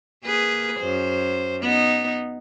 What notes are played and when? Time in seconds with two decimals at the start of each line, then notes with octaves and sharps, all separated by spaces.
0.24 A#3 G#4 B4
0.80 F#2 C5
1.62 B3 D#4